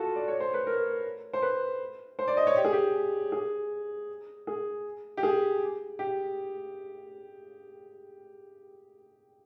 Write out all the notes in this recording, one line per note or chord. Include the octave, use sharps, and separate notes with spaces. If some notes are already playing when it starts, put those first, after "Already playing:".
Already playing: F4 F#4 A4
D5
C#5
C5
B4
A#4
C5
B4
C5
D5
D#5
C#5
G4
G#4
G4
G#4
G#4
G4
G#4
G4